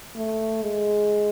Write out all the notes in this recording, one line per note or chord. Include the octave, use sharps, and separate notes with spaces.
A3
G#3